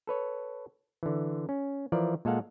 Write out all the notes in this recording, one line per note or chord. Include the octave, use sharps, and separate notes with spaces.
A4 B4 C#5
D3 E3
C#4
E3 F3 A#4 D5
A#2 G#3 A4 F5 F#5